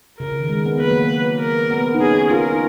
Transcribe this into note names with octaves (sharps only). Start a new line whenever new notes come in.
C#3 A#4
C#3
D#3
G#3
B3
A#3 B4
F#3
A#3
A#4
B3
D#4
C#4 G#4
C#4
F4 A#4
D#4